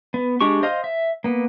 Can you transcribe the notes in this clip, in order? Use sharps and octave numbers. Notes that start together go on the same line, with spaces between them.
B3
G#3 D4 G4 C#6
C5 D#5 F5
E5
A#3 B3